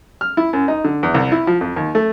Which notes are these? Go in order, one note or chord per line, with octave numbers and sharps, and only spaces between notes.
F6
E4
F#2
D#4
D3
E2
C2
E4
F3
F2
D#2
A3